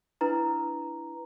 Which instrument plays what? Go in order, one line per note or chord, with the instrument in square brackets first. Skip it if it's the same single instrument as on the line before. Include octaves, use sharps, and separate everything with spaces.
[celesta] D4 E4 B4 A#5